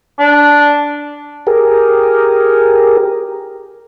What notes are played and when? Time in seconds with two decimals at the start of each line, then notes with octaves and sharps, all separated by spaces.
0.20 D4
1.47 G4 G#4 A#4